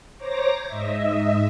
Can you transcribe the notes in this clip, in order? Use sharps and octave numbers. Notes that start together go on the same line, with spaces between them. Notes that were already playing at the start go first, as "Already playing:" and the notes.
C5 C#5 A#5 D6 A#6
G#2 D#5 E5